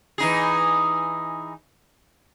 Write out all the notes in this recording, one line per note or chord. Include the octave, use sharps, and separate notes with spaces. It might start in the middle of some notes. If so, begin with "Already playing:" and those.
E3 D#4 G#4